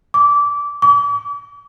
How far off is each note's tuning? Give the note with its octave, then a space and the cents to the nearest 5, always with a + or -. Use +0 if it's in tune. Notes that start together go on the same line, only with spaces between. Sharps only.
D6 -20
D6 -45